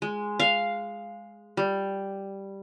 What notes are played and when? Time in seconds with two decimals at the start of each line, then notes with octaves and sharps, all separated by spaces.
0.02 G#3
0.40 F5
1.57 G3